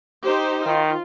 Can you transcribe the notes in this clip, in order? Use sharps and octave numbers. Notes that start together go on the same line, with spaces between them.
D#4 G4 C5
D#3 F4